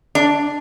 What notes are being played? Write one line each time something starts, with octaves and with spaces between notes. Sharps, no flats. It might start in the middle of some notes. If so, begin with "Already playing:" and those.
D4